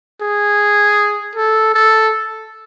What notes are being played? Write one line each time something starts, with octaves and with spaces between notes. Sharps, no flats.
G#4
A4
A4